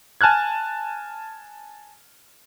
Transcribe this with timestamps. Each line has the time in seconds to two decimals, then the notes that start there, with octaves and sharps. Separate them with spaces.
0.21 G#5 A5 F6 F#6 G#6